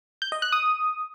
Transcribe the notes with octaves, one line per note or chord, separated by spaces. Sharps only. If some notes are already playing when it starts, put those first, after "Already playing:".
G6
D#5
F#6
D#6